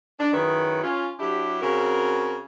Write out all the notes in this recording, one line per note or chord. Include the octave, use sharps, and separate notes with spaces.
D4
F#2 D#3 E4 G#4 B4 C#5
C#4 F4
F#3 D4 E4 G4
C#3 C4 F#4 A#4